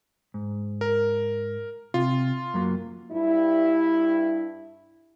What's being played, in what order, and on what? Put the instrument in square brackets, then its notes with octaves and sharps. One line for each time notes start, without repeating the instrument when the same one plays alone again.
[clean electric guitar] G#2
[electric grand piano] A#4
[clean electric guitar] C3 [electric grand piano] F4
[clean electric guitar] F#2 F#3 A#3
[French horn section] G2 E4